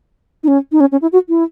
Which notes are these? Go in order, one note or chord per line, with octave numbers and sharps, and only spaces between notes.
D#4
C#4
D#4
C#4
C#4
E4
F#4
E4